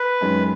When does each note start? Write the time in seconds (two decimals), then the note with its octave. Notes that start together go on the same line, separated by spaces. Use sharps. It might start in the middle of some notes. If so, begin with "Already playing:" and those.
Already playing: B4
0.21 F#2 D#3 G#3 C#4